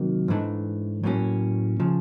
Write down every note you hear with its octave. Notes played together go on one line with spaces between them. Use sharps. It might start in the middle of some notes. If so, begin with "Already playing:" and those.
Already playing: C3 D#3 F#3 A#3
G#2 E3 A3 D4
A2 F#3 A#3 C#4
C#3 F3